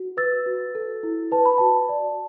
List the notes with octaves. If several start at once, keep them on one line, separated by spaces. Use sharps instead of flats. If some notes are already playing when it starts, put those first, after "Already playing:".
Already playing: F#4
B4 E6 A6
F#4
A4
E4
B4 A5
B5
F#4 A5
D5